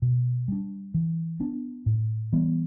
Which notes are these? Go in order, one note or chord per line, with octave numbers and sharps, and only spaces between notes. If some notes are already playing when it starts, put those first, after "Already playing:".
B2
G3 D4
E3
B3 D4
A2
E3 G3 B3